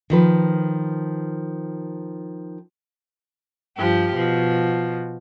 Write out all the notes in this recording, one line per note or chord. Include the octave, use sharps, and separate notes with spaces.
D#3 F3 B4
G2 F3 G4
B2 F3